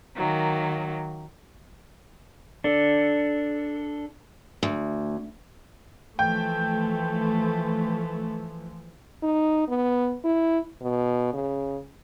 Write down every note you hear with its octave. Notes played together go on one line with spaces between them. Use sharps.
D#3 F#3 A#3
D4 A4
D2
E3 F3 A3 G5
D#4
B3
E4
B2
C#3